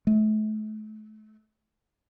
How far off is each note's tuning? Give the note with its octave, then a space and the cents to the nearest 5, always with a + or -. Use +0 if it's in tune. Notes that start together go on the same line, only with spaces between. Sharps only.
A3 -35